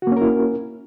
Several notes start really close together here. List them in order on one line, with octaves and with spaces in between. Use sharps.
F#4 A#3 C#4 A#4 E4